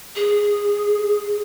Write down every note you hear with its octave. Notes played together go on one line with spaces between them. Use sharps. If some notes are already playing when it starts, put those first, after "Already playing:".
G#4